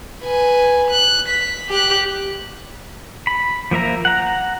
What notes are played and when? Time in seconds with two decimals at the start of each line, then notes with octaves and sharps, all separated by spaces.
0.23 B4 G#5
0.90 F#6
1.28 B6
1.69 G4 F#6
3.27 B5
3.71 F3 A#3 E5 A#5
4.05 F#5 A#5